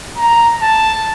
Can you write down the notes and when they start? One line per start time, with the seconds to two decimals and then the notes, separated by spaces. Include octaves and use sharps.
0.17 A#5
0.62 A5